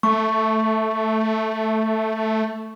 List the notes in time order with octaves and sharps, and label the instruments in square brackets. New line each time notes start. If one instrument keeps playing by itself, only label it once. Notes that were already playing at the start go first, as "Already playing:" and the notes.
[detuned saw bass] A3 [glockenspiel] C#6